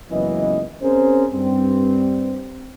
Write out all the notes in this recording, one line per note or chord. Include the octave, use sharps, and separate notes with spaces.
C#2 F#2 E3 A#3 B3 D#5
C4 C#4 G#4 A#4 C5
G2 G3 C4